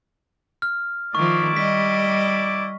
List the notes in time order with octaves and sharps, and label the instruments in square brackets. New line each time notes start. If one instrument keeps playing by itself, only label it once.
[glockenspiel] F6
[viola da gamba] D#3 F3 [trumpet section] E4 D5 D6 [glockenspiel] C#6
[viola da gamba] G3 D#5 [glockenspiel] B6